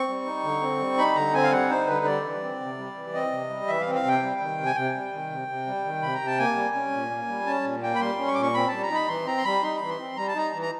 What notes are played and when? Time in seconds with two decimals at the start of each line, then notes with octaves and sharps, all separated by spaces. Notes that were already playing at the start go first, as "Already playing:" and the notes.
Already playing: C4 C#6
0.08 G3
0.26 D#4
0.43 D3
0.61 C4
0.80 G3
0.98 D#4 B5
1.15 D3 A#5
1.34 C4 G#5
1.43 F5
1.51 G3 F#5
1.69 D#4 C5
1.87 D3 B4
2.05 G3 D5
2.24 E3
2.42 C4
2.60 C3
2.78 G3
2.95 E3
3.14 C4 D#5
3.32 C3
3.49 G3
3.68 E3 E5
3.81 F5
3.87 C4
3.95 F5
4.04 C3 G5
4.22 G3
4.40 D#3
4.58 C3
4.66 G#5
4.75 C3 G5
4.94 G3
5.13 D#3
5.30 C3
5.48 C3
5.67 G3
5.84 D#3
6.02 C3 B5
6.15 A#5
6.21 C3
6.27 A5
6.38 A#3 G#5
6.56 G3
6.75 C#4
6.92 A#2
7.11 A#3
7.28 G3
7.47 C#4 A5
7.64 A#2
7.82 A#3 G5
7.95 B5
8.00 G3 C6
8.18 C#4
8.28 C#6
8.34 A#2 D6
8.43 C#6
8.54 C4 B5
8.68 G3 A5
8.82 A#5
8.90 D#4 B5
9.08 E3 C6
9.26 C4 A#5
9.37 C6
9.45 G3 B5
9.63 D#4 C6
9.76 E3 B5
9.89 C6
9.99 C4
10.17 G3 A#5
10.28 A5
10.35 D#4 A#5
10.53 E3
10.62 A#5